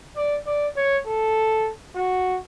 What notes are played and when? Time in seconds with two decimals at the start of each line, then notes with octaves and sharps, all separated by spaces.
0.16 D5
0.46 D5
0.76 C#5
1.06 A4
1.95 F#4